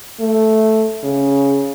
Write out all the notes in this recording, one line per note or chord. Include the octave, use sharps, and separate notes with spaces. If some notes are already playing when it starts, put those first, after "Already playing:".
A3
C#3